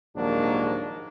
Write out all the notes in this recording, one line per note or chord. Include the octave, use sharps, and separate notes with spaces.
A#1 D#2 G#2 F#3 A#3 D4